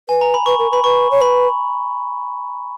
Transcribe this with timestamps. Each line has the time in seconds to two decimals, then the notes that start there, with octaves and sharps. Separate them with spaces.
0.09 B4 G#5
0.21 A#5
0.34 B5
0.46 B4 C#6
0.59 A#4
0.72 B4 B5
0.84 B4 C#6
1.11 C#5
1.21 B4 B5